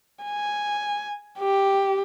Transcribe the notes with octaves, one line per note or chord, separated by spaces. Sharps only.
G#5
G4